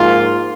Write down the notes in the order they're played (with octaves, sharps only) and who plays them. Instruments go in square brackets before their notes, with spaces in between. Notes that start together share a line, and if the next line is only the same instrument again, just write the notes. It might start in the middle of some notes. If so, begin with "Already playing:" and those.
Already playing: [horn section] G#2 F3 A#3 F4